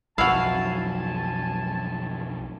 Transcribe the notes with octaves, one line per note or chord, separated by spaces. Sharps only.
B1 F2 F#3 E4 F#4 F5 G#5 A5